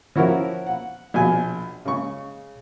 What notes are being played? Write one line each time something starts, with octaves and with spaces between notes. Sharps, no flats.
F3 C#4 E4 F#4 A#4
F#5
A#1 B2 G#5
C#3 G#3 C#6